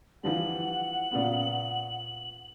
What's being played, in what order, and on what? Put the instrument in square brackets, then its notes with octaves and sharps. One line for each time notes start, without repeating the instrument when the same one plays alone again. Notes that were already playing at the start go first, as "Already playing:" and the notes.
[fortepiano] E3 F3 G3 [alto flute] F#5 [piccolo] F#7
[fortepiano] A#2 C#3 B3